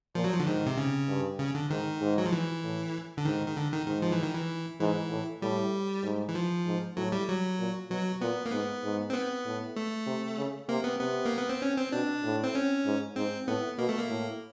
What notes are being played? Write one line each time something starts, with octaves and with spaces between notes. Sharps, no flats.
A#2 F3
F#3
F3
D3
G#2 D#3
C3
C#3
G2
C#3
D3
G#2 D#3
G#2
F#3
F3
E3
A2
D3
G#2 D#3
D#3
D3
D#3
G#2 D#3
F3
E3
D#3
E3
G#2 E3
A2
A2 G3
G#2
E3
F3
G#2
A2 F#3
G3
F#3
A#2
B2 F#3
A#2 B3
A#3
G#2 B3
G#2
C4
B3
A2
A3
C3
C#3
C3 A#3
B3
C3 B3
A#3
B3
C4
C#4
C4
B2 D4
A2
C4
C#4
G#2
G#2 C4
A2 B3
B2 A#3
A3
A#3
A2